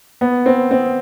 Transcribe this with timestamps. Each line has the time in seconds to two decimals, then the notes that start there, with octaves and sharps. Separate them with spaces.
0.21 B3
0.46 C4
0.71 C4